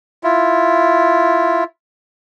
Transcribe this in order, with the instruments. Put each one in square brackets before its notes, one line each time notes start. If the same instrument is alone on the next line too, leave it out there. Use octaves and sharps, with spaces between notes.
[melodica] E4 F4